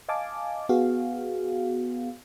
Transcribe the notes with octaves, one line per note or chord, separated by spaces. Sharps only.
D#5 F5 G#5 A5 D6
B3 F#4 G#4 F5